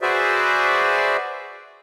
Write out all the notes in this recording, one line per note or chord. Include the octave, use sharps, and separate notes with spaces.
F#4 G#4 B4 C5 D5 E5